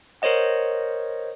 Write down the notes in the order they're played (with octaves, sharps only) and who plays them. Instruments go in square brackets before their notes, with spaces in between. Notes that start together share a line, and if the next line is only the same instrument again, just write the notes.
[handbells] A#4 C5 C#5 D#5 F#5